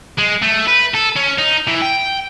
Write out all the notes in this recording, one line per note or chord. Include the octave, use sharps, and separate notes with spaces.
G#3
A3
B4
A4
C#4
D#4
E3
G5